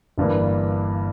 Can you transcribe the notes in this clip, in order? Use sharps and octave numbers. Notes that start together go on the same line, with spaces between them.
G1 G2 E3 A#3